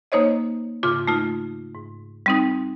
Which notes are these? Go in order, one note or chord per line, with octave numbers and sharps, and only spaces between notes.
A#3 D#4 C5 C#5 D#5
G#2 C#3 F4 D6
A3 D#4 F4
G#2
G3 C4 D#4